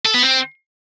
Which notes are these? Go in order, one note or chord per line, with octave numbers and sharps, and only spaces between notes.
A4
B3
C4